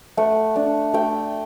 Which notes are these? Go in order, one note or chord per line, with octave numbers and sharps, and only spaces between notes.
A3 F#5
D4
A3 G5